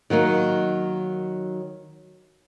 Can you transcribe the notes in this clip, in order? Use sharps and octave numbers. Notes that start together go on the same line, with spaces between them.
D#3 F#3 A#3 D#4